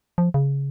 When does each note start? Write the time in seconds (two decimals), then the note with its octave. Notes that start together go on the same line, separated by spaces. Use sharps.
0.18 F3
0.34 C#3